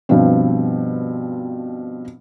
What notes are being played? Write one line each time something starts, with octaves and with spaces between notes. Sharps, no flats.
G2 B2 F3 C4